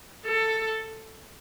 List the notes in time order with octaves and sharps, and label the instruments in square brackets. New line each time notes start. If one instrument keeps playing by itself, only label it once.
[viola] A4